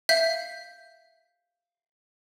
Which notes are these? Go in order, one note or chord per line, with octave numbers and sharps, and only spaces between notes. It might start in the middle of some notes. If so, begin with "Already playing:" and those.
E5 F5 G6 B6